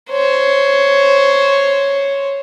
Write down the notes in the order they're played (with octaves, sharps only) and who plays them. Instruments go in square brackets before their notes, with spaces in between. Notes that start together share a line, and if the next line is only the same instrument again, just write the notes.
[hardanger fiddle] C5 C#5